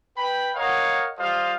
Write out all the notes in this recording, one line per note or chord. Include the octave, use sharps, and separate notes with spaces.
B4 G5 B5
A#4 C#5 D#5 F5 F#5
G3 F4 A4 C5 D#5 F5